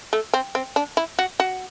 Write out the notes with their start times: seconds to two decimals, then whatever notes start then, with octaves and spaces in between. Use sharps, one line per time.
0.13 A3
0.34 C4
0.55 C4
0.76 D4
0.97 E4
1.19 F#4
1.40 F#4